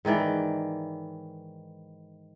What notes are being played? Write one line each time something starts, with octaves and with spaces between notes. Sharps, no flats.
G#2 D#3 E3 D5